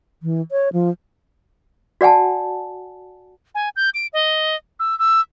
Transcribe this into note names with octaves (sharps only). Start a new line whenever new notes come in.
E3
C#5
F3
F#4 D5 F#5 G#5 A5
G#5
G6
D7
D#5
E6
E6